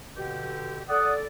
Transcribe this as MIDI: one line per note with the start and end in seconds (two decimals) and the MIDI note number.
0.17 0.83 47
0.17 0.83 50
0.17 0.83 67
0.89 1.26 69
0.89 1.26 74
0.89 1.12 78
0.89 1.12 87